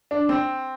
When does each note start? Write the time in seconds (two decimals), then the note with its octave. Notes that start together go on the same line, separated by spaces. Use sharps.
0.11 D4
0.29 C4